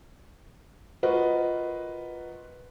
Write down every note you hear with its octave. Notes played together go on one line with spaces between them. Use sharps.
F4 F#4 A#4 B4 D#5